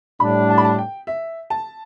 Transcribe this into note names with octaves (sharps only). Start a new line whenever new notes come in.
A2 G3 D4 B5
A5
B5
A5
G5
E5
A5